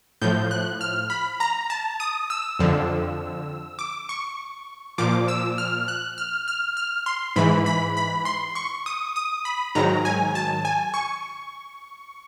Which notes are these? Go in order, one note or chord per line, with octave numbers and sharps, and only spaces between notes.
A2 F3 G6
F#6
F6
B5
A#5
A5
D#6
E6
F2 D3 F3
D6
C#6
A#2 F3 D6
E6
F6
F#6
F6
F6
F6
C6
G#2 E3 B5
B5
B5
C6
C#6
D#6
D#6
B5
G#2 D#3 F#3 A#5
G#5
A5
G#5
C#6